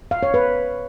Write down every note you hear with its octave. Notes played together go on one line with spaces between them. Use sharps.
F5
C#5
B4